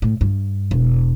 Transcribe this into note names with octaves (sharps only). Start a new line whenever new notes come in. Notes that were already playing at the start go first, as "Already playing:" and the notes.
A2
G2
E1